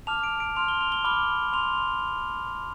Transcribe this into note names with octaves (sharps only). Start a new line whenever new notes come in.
A5 D6 F6 F7
D7
D7
C6 F6 F7
G7
F7
G7
B5 D6 F6 G7
C6 F7